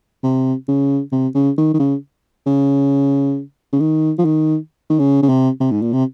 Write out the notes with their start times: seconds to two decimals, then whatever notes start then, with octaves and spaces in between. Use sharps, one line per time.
0.23 C3
0.68 C#3
1.12 C3
1.35 C#3
1.58 D#3
1.74 D#3
1.79 C#3
2.46 C#3
3.72 C#3
3.80 D#3
4.18 F3
4.25 D#3
4.90 D#3
4.99 C#3
5.23 C#3
5.29 C3
5.60 C3
5.71 G#2
5.82 A#2
5.93 C3